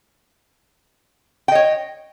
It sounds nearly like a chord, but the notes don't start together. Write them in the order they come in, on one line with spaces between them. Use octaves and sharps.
G5 D#5 C#5